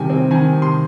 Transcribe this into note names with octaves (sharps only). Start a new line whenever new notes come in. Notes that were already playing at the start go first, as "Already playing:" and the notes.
Already playing: C3 D#3 G3 G5 G#5
C4
D#3 G#5
C3
C6